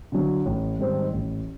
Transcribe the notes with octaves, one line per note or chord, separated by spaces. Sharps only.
D3 F#3
A1
G#2 D#3 G3 C4
A1